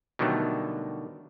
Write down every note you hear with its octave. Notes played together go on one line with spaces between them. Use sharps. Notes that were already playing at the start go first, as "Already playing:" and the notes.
B2 D3 D#3 F#3 G3 A3